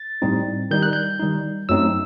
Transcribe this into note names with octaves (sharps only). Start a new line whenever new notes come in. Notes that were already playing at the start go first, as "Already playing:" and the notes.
Already playing: A6
A2 G3 C4 D#4
D#3 G3 D#4 G6
F#6
G6
D#3 G3 D#4
F#2 F#3 A3 C4 D#4 E6